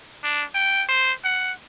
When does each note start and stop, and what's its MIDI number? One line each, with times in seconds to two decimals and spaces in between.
0.24 0.44 62
0.54 0.83 79
0.89 1.12 72
1.24 1.52 78